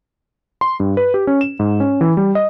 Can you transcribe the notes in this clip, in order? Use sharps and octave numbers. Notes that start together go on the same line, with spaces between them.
C6
G2
B4
G4
C#4
E7
G#2
C#4
E3
G3
D#5